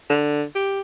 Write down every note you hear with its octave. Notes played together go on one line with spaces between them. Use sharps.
D3
G4